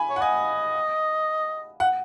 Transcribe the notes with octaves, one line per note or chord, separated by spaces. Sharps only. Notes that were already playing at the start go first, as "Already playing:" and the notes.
Already playing: G#5 B5
C#5
F#5
D#5 G#5
F#5